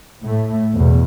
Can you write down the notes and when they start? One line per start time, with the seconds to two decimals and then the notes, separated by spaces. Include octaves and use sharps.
0.25 A2 A3
0.75 E2 B2